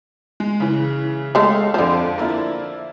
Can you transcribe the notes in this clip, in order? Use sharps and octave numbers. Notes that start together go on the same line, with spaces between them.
G#3
C#3 E3
G#3 A3 A4 C#5 F5
F2 D3 F3 C5
A#3 E4 F4